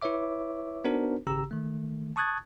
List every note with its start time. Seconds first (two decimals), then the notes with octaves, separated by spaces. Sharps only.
0.02 E4 B4 C#5 E5 D6
0.84 B3 D4 D#4 F#4 A#4 C5
1.27 G#1 C#3 G4 A#5 E6
1.51 D#3 A3
2.16 A5 C#6 D#6 F#6 G#6 A6